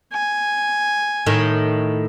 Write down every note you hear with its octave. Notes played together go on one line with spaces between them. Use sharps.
G#5
A2 D#3